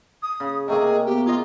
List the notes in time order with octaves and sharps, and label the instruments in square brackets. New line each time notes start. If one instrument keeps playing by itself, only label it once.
[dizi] D#6
[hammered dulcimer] C#3
[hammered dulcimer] C3 A3 A#3 [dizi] G#4 [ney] D#5
[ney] B3 [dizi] G4
[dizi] F4 [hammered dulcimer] G#4 D#5